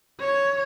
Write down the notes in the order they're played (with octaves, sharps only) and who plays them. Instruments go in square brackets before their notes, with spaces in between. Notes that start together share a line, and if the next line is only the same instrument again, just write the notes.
[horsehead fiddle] C#5